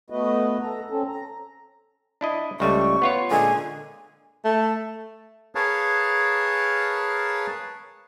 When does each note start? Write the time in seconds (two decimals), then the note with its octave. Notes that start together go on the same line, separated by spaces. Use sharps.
0.10 A3 B3 F#4 B4 D#5
0.61 A4 A#5
0.90 C4 C#4 A4
1.08 A#5
2.21 D4 E4 D#5
2.60 C#2 G3 A3 C#6
3.02 B3 F4 C#5
3.31 A#2 D3 G#3 G#5
4.45 A3
5.55 G#4 A#4 B4 C#5 F5 A5